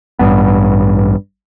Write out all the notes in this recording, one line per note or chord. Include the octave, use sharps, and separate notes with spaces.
A1 G2 B3